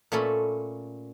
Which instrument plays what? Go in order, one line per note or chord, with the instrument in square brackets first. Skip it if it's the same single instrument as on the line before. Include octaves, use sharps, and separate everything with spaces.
[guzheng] A#2 A3 C#4 A4 B5